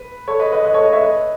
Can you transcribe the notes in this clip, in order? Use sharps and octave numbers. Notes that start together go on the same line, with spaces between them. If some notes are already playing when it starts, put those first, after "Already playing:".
Already playing: B4
A4 C#5
B4 D#5
B4 D#5
B4 D#5
A4 C#5
B4 D#5
C#5 E5
B4 D#5